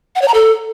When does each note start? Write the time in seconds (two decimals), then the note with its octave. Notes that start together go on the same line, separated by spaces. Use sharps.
0.15 F#5
0.22 C#5
0.28 A#5
0.34 A4